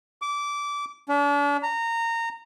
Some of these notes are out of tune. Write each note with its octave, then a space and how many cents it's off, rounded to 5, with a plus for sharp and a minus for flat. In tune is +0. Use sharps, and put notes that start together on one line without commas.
D6 -20
D4 -40
A#5 -20